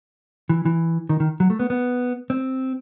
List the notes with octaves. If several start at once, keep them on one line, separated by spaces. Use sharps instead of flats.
E3
E3
D#3
D#3
F#3
A3
B3
B3
C4